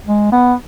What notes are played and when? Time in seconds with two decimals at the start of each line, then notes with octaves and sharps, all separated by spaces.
0.07 G#3
0.32 B3